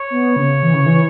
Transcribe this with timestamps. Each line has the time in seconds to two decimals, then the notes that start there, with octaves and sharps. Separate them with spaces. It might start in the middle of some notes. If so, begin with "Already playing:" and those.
Already playing: C#5
0.10 B3
0.36 C#3
0.63 E3
0.74 C#3
0.86 E3